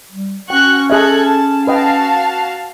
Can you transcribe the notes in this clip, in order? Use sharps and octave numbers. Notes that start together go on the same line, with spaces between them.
G3
C#4 F#4 G5 C#6 F#6
G#4 A4 D#5 E5 F#6 G#6
A5
F#4 B4 D#5 F5 G5 A5